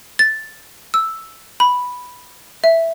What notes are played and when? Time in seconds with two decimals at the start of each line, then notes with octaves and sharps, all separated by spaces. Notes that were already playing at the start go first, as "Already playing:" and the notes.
0.19 A6
0.94 E6
1.60 B5
2.64 E5